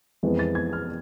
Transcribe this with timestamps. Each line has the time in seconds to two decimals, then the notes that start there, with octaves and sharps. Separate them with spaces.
0.23 F2 E3 G#3 B3
0.39 A6
0.55 G#6
0.73 F6